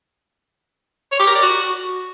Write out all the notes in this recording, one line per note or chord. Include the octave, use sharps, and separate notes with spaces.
C#5
G4
A#4
D5
F#4